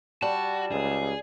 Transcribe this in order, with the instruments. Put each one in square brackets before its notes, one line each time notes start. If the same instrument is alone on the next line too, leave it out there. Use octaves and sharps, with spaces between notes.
[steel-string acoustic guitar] G3 [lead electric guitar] F#4 [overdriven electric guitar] A5
[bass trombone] C#2 [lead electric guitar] G#4